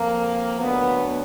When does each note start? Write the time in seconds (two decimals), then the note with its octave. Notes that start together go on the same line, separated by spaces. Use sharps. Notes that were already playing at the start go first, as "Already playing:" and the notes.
Already playing: F2 F3 A#3
0.60 D2 D3 F#3 B3